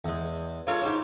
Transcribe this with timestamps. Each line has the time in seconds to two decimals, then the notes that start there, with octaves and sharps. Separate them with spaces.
0.05 E2 G#3
0.67 G#3 F4 A4 C#5
0.81 G#2 D#4 G4 C#5